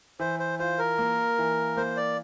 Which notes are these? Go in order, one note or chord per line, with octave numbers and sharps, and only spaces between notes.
E3 C5
C5
F4 C5
A#4
A#3
E3
A#3 C5
D5